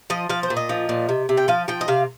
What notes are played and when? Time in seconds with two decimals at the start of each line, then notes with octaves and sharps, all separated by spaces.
0.10 F3 D#5
0.29 F3 F5
0.43 C5
0.50 A#2
0.57 D#5
0.69 F3
0.89 A#2
1.09 C3
1.29 C3
1.37 G5
1.48 F3 F5
1.68 F3 G5
1.81 D#5
1.88 C3 F5